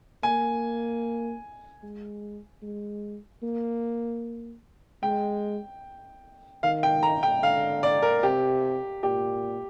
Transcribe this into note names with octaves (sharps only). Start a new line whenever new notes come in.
A#3 G#5
G#3
G#3
A#3
G#3 G5
D#3 F5
G5
A#5
G5
D3 F5
D5
A#4
C3 G4
A#2 G4